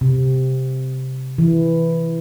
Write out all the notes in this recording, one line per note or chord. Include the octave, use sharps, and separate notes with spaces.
C3
E3